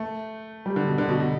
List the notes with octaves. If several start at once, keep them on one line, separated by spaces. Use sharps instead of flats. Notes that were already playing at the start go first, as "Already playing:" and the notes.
Already playing: A3
G3
D3
B2
D3
B2
B2